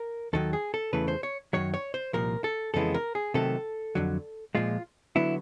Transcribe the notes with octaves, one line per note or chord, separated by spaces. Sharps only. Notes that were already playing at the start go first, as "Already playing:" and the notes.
Already playing: A#4
D#2 D#3 F#3 A4
G#4
A4
E2 C#3 E3 A3 B4
C5
C#5
F#2 D#3 F#3 C#5
C#5
C5
C2 A#2 F3 A#4
A4
F2 C#3 E3 G#3 B3 A4
A#4
G#4
C3 D#3 F#3 A3 A4
F2 D3 F#3
A#2 F3 G#3 F4
D3 F#3 B3 E4